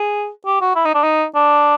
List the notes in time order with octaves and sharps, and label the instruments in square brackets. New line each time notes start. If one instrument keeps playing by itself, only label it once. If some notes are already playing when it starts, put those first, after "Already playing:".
Already playing: [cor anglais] G#4
G4
F#4
E4
D#4
D4
D#4
D4